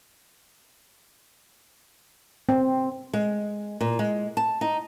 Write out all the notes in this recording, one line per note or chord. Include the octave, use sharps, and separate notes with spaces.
C4
G#3
A#2
G#3
A5
D#4